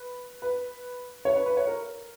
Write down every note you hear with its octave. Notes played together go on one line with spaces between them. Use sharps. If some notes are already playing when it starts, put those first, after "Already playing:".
Already playing: B4
B4
C#5
B4
B4
C#5
A#4